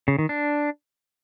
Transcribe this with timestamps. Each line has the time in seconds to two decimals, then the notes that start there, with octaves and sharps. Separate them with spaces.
0.08 C#3
0.19 D#3
0.29 D4